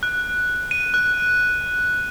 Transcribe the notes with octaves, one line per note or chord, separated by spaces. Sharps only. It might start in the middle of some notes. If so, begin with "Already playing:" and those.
F#6
D#7
F#6